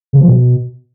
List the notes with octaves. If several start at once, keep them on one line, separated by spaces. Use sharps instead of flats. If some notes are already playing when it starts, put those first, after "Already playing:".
C#3
F3
B2